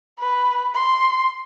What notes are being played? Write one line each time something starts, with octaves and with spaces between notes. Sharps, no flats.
B4
C6